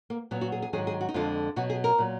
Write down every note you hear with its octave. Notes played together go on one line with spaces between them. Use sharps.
A#3
A#2 F#3 B3
F#4
G#4
G#4
G#2 D#3 F#3 G#4
G#4
F#4
D#4
F2 D3 G#3 F4
B2 F#3 F#4
G#4
A#4
A#2 F#3